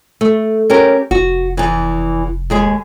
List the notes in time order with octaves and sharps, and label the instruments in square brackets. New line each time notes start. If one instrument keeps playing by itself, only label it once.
[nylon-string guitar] A3
C#4 G4 A#4
[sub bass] F1 [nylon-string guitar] F#4
[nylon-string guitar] E2 E3
D#2 G#3 G#4